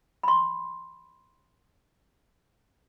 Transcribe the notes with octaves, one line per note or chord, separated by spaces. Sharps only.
B5 C6